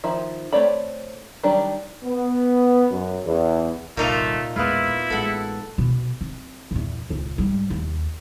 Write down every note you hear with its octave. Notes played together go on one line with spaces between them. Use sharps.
D#3 F3 E4
A3 C4 C#5 D5 B5
D#3 F#3 G3 D4 G4
B3
F#2
E2
G1 C2 A#2 A3 D#4 F5
B1 E2 G#3 B3 E4 F4
A1 G#3 A4 F#5
B2
C4
E2 A#2
D#1 C#2
G#2 G3
D#2